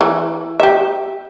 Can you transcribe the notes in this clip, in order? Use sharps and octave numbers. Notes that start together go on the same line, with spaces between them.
E3
G4 E5